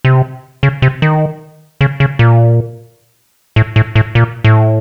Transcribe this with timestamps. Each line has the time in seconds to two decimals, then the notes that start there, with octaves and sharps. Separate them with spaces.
0.05 C3
0.63 C#3
0.82 C3
1.02 D#3
1.81 C#3
2.00 C#3
2.19 A#2
3.56 A2
3.76 A2
3.95 A2
4.15 A#2
4.44 A2